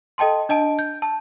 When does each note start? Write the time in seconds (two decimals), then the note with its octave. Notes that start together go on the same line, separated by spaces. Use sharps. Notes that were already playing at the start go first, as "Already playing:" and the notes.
0.18 A4 D#5 G5 A5 C6
0.49 D4 D#5 A5 D7
0.79 G6
1.02 A5